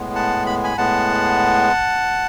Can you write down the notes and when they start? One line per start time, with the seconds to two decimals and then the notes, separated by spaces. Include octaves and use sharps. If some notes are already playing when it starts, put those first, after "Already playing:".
Already playing: A2 G#3 B3
0.15 F#5 A5
0.46 B5
0.64 G#5 B5
0.78 A2 G#3 B3 F#5 A5